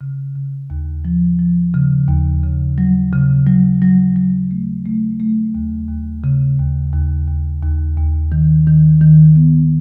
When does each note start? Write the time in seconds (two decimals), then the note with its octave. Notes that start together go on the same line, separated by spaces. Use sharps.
0.01 C#3
0.36 C#3
0.70 D#2
1.05 F3
1.39 F3
1.74 C#3
2.08 D#2
2.43 C#3
2.78 F#3
3.13 C#3
3.47 F#3
3.82 F#3
4.16 F#3
4.51 A3
4.86 A3
5.20 A3
5.55 D#2
5.89 D#2
6.24 C#3
6.59 D#2
6.93 D#2
7.28 D#2
7.63 D#2
7.97 D#2
8.32 D#3
8.67 D#3
9.01 D#3
9.36 B3